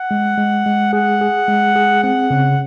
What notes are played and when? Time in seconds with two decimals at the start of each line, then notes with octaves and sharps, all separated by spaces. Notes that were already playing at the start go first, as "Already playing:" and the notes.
Already playing: F#5
0.11 G#3
0.38 G#3
0.66 G#3
0.93 G#4 F#5
1.21 G#4
1.48 G#3
1.76 G#4
2.03 C4 F#5
2.30 C#3